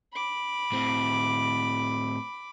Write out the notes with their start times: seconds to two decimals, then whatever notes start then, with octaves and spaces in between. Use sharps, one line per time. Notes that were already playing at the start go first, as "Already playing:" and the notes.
0.14 B5 D6
0.72 A2 C4